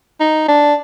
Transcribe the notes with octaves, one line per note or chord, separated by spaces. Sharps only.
D#4
D4